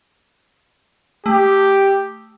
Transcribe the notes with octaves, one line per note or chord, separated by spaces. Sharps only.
A3 G4